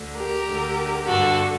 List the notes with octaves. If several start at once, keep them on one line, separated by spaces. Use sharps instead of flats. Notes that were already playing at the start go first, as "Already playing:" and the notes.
Already playing: D2 D3
G4 A#4
D2 D3
G2 D3 F#4 A4